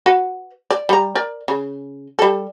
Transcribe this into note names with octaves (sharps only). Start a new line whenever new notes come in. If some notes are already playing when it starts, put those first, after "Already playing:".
F#4 B4 F#5
D5
G3 A#5
A#4 D5
C#3
G3 A4